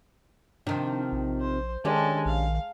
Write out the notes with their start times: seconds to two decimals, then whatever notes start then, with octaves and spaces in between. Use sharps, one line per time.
0.67 C3 D#3 F3 D4
1.12 A#1
1.41 C5
1.85 D#3 G#3 C#4 D4 G4 A4
2.26 A#1 F5